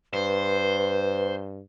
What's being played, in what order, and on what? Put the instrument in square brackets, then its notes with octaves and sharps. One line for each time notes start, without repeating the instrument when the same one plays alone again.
[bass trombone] G2 [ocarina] B4 [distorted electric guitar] C5